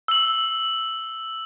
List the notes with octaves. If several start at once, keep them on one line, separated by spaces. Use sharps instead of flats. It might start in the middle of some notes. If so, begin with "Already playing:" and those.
E6 F#7